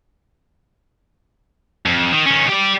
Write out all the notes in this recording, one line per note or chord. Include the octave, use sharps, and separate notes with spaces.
F2
D#3
D#3 C#4
G4 D5